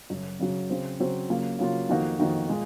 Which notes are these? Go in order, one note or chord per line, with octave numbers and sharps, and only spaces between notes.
F#2 C#3 F#3
F#2 C#3 F#3
C#3 F#3 C4
C#3 F#3 C4
C#3 F#3 A#3 F4
C#3 F#3 A#3 F4
F2 D#3 A#3 D#4 F#4
F2 D#3 A#3 D#4 F#4
A#2 G#3